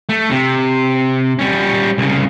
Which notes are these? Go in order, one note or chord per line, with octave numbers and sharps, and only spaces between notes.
A3
C3
G3 C#4
C2 C#3